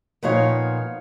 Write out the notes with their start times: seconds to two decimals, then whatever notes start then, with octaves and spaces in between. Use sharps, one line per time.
0.23 A#2 F3 B3 D#4 C#5 F5